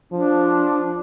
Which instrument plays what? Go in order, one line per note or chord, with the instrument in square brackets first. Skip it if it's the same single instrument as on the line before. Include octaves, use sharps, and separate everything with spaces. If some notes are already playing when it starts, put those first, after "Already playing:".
[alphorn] F3 [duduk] D4